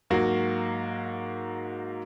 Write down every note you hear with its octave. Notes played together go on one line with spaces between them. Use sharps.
G#2 F#3 A#3 F#4